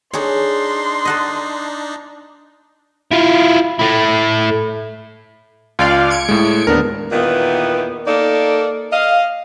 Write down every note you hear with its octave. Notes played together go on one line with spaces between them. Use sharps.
D4 D#4 G#4 C#5 C6
D#5 F#5 A5
E4 F4
A3 E4
C#2 F4 D5 F5
G#6 C#7 D7
A2 G#3
D#2 B3 D4 A#4
E2 A#2 D#3 B3
A#3 D#4 A4 A#4 D5
D#5 F5